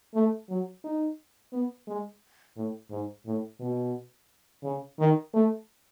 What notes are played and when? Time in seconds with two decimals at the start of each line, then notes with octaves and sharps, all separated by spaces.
0.15 A3
0.49 F#3
0.84 D#4
1.52 B3
1.88 G#3
2.56 A2
2.90 G#2
3.26 A2
3.60 B2
4.63 C#3
4.99 D#3
5.33 A3